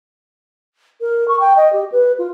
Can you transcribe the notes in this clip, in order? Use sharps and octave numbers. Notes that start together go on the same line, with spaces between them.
A#4
C#6
G5
D#5
G4
B4
F4